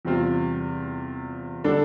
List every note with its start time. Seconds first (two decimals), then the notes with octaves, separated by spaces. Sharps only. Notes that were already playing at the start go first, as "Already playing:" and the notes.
0.05 E2 C3 G3 C4 F4
1.64 D3 G3 D4 A4